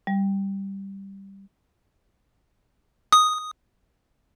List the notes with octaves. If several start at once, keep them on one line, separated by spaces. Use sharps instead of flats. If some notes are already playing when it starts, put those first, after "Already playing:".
G3
D#6